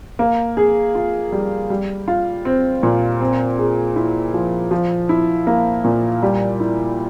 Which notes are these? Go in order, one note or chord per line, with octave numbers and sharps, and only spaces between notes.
A#3
G#4
F4
G3
G3
F4
C4
A#2
C4
G#4
E4
F3
F3
E4
A#3
A#2
G3
E4